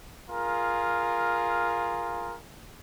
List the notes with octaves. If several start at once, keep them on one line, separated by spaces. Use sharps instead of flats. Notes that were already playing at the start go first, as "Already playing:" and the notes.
F4 G#4 A#4